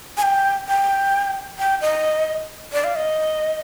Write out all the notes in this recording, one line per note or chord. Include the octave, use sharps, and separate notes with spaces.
G#5
G5
G5
G5
D#5
D5
F5
D#5